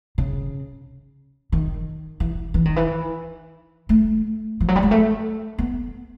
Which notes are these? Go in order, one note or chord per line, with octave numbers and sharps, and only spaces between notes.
C#3
D#3
E3
E3
D#3
E3
A3
F3
F#3
G3
G#3
A3
B3